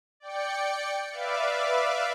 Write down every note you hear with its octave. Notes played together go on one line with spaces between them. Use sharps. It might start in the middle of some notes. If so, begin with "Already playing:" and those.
D5 G5 C#7
B4 D5 E5 F5 D6